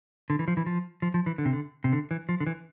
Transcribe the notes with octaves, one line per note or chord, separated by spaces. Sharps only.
D3
E3
F3
E3
F3
F3
F3
E3
D3
C3
D3
C3
D3
E3
F3
D3
E3